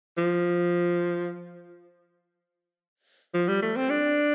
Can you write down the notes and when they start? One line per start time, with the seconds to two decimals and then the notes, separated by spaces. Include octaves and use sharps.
0.17 F3
3.34 F3
3.48 G3
3.62 A3
3.76 C4
3.90 D4